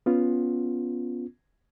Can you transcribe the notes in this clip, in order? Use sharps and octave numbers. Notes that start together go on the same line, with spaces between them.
B3 C#4 F4